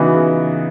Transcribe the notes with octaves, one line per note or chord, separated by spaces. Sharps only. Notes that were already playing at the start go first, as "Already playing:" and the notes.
Already playing: C#3 E3 B3 D#4 F#4
C#3